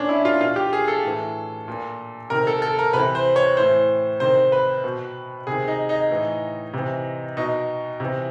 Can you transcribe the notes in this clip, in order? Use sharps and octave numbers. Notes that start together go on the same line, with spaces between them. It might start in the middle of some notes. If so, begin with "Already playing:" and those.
Already playing: A#2 C#4 D4
E4
F4
B2 F4
G4
G#4
A4
A2 E3
A#2
C3 D#3 A#4
A4
A4
A#4
C3 E3 B4
C5
C#5
A2 E3 C5
C3 D#3 C5
B4
B2
C3 D#3 G#4
D#4
D#4
A2 E3
C3 E3
B2 D#4
C3 E3